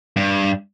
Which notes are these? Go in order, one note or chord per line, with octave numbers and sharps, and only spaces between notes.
G2